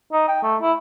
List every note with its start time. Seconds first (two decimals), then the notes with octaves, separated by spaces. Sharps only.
0.13 D#4
0.28 G5
0.43 A3
0.61 E4